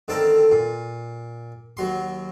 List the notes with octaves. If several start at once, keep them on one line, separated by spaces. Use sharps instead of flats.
D3 D#3 C4 A4 A#4
A#2
D#2 F#3 C6